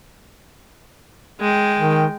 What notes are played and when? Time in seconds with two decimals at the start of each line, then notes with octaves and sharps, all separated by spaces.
1.41 G#3 G5
1.78 D#3